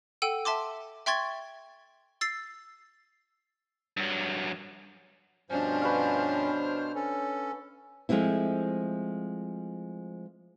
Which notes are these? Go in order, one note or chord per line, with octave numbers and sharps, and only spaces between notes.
A4 F#5 G5 E6 D#7
E5 A5 C6 D6
E5 G5 C6 C#6 G#6 A6
E6 A6 C7
G2 F#3
G2 B2 F3 C#4 D4 C5 F6
B4 C#5 F5
C#4 A4
F3 G#3 A3 C4 E4